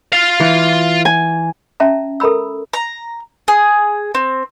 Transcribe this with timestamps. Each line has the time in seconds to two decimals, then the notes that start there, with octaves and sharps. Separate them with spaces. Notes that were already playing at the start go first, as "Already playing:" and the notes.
0.13 F4 F5
0.40 E3
1.05 G#5
1.80 C#4 E5 A5 A#5
2.20 A4 A#4 A#5 B5 E6
2.73 A#5
3.48 G#4
4.15 C4